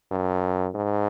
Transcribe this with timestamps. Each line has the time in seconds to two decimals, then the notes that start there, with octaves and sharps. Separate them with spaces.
0.11 F#2
0.74 G#2